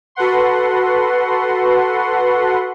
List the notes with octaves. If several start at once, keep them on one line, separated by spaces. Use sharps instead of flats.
F#4 A4 B4 F#5 C6